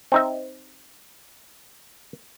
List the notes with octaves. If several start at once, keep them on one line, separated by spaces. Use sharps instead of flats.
C4 D#4 E5